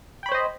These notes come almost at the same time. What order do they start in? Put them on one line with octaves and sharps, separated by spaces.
G5 B5 C#5 C5 D#5